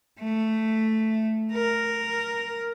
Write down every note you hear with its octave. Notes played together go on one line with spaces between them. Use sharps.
A3
A#4